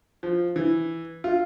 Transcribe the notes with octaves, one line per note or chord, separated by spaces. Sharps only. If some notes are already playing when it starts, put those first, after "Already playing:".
F3
E3
F4